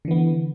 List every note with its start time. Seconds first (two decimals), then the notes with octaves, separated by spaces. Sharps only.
0.05 D3
0.08 E3
0.11 B3